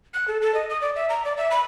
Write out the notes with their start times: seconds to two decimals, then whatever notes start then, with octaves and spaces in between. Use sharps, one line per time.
0.14 F#6
0.28 A4
0.41 A4
0.54 D#5
0.69 D#6
0.81 D5
0.96 E5
1.09 A#5
1.25 D5
1.37 E5
1.51 B5